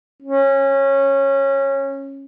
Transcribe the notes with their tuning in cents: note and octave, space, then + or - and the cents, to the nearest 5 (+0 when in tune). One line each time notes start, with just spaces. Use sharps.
C#4 -20